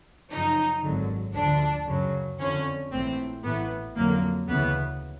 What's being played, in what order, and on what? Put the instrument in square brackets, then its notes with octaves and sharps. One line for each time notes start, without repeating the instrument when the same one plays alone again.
[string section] F#2 C#3 F3 D#4
G#1 F#2 D3 F#3
D2 D3 F3 D4
F#2 C#3 F#3
F2 D3 F3 C#4
A#1 A2 E3 C4
A1 A2 E3 B3
F2 D3 F#3 A#3
D2 C#3 E3 B3